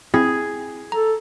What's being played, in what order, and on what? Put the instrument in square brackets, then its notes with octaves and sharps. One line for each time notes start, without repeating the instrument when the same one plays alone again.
[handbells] C4 E4 [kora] G#4
[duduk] A4 [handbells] A#5